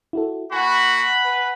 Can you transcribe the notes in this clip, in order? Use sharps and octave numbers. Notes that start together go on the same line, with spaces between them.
E4 F#4 A4
A#3 F#4 F#5 G#5 B5
B4